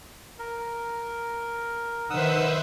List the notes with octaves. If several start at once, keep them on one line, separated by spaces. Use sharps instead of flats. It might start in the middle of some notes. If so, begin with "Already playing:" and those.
A#4
D#3 B4 C5 E5 F#5 D#6 E6